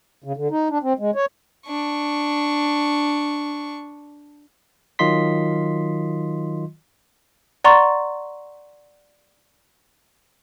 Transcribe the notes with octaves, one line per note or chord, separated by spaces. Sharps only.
C#3
D3
D#4
D4
C4
G#3
C#5
D4 C#6
D#3 F#3 F4 D#5 C6 B6
D5 F#5 A#5 C6 C#6 A6